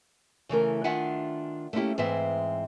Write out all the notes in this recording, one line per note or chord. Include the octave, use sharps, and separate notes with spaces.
C#3 E3 A3 A#4
D#3 D4 F4 E5 F#5 G#5
A3 A#3 C#4 E4 G4
G#2 E3 G#3 C4 E5